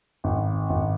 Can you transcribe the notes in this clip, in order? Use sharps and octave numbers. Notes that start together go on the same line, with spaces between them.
G#1
G#1